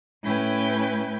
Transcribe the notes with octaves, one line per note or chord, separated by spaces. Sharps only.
A2 C#4 E4 B4 G5 G6